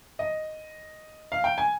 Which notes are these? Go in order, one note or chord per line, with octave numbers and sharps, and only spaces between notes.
D#5
F5
G5
G#5